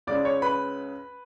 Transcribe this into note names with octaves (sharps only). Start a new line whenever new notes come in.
C#2 C#3 G#3 D5 D6
C#5 C#6
B4 B5